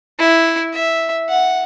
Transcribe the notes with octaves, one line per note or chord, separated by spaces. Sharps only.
E4
E5
F#5